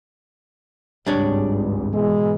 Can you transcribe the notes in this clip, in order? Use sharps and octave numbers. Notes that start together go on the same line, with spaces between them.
G#1 C#2 G2 G3 D4 C#5
G#2 B2 E3 G#3